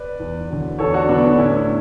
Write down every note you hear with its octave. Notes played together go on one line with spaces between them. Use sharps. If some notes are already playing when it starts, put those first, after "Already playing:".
Already playing: B4 D5
E2
D3 F#3
E2 A4 C#5
D4 F#4
D3 F#3 B3 D4
B3 D4
A2 C#4 E4